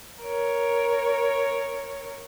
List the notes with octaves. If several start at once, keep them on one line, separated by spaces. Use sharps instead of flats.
A#4 C#5